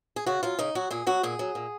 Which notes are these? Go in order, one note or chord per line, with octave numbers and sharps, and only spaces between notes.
G#4
C#3 F#4
F#3 F4
C#3 D#4
F#3 F#4
A#2 G#4
F#3 F#4
A#2 G#4
F#3
A#2